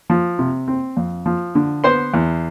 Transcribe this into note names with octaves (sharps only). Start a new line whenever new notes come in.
F3
C3
C4
F2
F3
D3
B3 C5 C6
E2